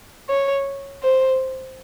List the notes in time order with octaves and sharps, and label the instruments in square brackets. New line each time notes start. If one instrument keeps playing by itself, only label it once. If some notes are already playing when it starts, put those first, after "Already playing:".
[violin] C#5
C5